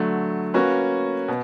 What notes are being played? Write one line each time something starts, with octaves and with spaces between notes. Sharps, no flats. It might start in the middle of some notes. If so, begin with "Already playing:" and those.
Already playing: D3 F#3 A3
A#3 C#4 F#4 B4
B2